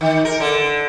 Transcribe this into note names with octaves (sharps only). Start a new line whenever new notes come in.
D#3
A#4
D3